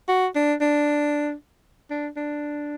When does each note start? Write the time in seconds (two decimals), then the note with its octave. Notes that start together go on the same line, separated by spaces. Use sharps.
0.08 F#4
0.36 D4
0.61 D4
1.90 D4
2.16 D4